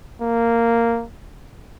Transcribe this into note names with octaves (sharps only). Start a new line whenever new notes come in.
A#3